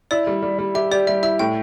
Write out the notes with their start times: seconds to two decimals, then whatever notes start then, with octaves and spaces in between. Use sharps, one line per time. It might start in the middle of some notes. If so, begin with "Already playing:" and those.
0.11 E4 D5
0.27 G3
0.42 G3
0.58 G3
0.75 G4 E5
0.91 G4 D5
1.07 G3 E5
1.23 E4 E5
1.39 A2 G5